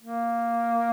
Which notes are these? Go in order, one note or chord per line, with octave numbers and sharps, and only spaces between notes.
A#3